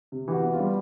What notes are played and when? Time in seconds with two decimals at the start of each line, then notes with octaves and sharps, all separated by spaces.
0.12 C3
0.28 E3 G4
0.32 F#4
0.44 B3
0.53 F4
0.59 G3